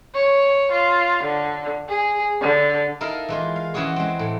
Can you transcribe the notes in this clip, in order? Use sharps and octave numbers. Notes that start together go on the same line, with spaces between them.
C#5
F4
D3
G#4
D3
D#4 E4 A4 A#4 F5
E3 G#3 F4
F5
E3 C#4 E4 F#4 G#4 C#5
G#3 C4
A2